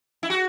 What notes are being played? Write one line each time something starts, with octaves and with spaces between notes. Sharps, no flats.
E4
F#4